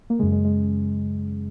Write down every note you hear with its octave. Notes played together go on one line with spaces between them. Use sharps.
A#3
F#2 C#3 G#3
G#3
G#3